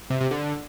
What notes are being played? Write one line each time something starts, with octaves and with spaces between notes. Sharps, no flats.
C3
C3
D3